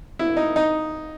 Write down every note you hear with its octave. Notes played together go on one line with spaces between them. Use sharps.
E4
D#4
D#4